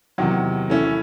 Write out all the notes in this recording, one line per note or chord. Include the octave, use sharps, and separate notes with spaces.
E2 C3 D#3 F#3
E3 A3 C#4 E4